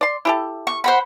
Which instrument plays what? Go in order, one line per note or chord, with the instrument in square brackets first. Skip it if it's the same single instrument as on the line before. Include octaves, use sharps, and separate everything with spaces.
[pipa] D5 C6
E4 G4 A4
[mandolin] C#6
C5 F#5 B5